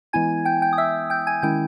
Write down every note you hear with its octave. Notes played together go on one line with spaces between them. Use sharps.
E3 G#3 B3 E4 G#5 G#6
G5 G6
G5 G6
D#6
E5 E6
G5 G6
G#5 G#6
D#3 G#3 C#4 E4 G5 G6